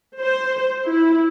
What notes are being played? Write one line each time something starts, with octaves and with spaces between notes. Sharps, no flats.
C5
E4